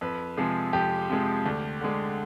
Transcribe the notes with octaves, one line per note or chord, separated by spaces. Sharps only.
F2 B4
C3 F3 G#3 G#4
F2 G4
C3 F3 G#3
D2
D3 G#3